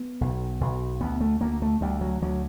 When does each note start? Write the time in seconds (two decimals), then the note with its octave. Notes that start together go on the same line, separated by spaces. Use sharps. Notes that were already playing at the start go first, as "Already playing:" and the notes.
Already playing: B3
0.21 B1
0.61 B1
1.01 D2 B3
1.21 A3
1.41 D2 A#3
1.62 A3
1.81 D2 G3
2.01 F#3
2.22 D2 F#3